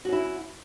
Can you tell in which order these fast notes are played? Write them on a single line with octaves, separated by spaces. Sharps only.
F#4 C#4 E4